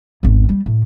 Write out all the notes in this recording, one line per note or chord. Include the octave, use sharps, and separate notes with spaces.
G#1 E2
G3
A2